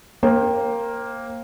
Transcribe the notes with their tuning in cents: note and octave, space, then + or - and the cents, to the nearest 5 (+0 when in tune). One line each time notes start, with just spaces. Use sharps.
A#3 +0 C5 +35 G5 +0